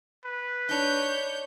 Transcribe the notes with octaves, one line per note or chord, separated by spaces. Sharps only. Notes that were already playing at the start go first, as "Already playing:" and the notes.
B4
D4 D#4 C#5 G6